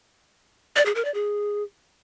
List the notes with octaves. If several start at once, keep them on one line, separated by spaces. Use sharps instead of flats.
D5
G#4
A#4
D5
G#4